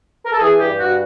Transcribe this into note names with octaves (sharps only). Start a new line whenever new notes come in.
A#4
A4
E3 G#4
G2 G4
G2 F#4